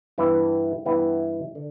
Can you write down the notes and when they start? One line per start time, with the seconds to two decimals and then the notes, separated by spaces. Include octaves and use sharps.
0.18 G2 E3 B3 E4 B4
0.86 G2 E3 B3 E4 B4
1.55 D3